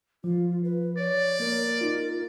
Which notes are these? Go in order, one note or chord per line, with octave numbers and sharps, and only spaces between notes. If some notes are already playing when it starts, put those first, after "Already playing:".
F3 F4
B4
C#5 D5
A#3 A#4
D#4 F4